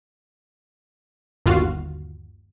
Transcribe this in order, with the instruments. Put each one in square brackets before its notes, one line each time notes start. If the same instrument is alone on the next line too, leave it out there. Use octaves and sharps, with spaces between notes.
[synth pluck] G1 D#2 F4 F#4 F5